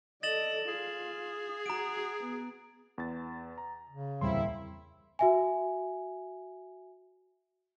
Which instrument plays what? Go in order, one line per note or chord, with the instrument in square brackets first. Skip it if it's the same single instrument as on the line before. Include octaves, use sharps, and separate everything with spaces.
[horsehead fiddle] A4 D5 [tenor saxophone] D#5 [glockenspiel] A6 E7 F#7
[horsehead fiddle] F4 [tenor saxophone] G#4
[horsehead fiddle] F#4 [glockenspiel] A#5 D7
[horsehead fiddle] B3
[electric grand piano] E2 A6
A#5
[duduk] C#3
[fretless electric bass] D1 E2 G3 [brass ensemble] A#3 C4 E4 [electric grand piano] C6
[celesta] F#4 E5 G#5